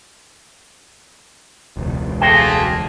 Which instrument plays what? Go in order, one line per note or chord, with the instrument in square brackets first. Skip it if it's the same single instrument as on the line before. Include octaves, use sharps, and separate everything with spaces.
[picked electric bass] E1 C#2
[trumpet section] A3 A#3 G#4 [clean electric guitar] F#4 C5 G5